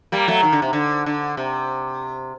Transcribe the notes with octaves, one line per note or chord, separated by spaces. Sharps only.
G3 A#3
F#3 A3
D#3
D3
C3
D3
D3
C3